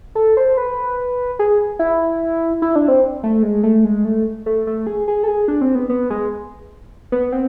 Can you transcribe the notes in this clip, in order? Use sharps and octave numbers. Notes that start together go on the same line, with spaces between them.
A4
C5
B4
G#4
E4
E4
D4
C4
A3
G#3
A3
G#3
A3
A3
A3
G#4
G#4
A4
G#4
D4
C4
B3
B3
G#3
B3
C4